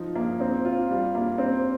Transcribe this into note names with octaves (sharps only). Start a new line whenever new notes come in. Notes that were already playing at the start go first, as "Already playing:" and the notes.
Already playing: F3 D#4
A#3
C4
F4
G3
A#3
C4